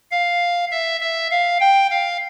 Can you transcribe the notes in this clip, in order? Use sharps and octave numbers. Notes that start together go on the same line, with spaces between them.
F5
E5
E5
F5
G5
F5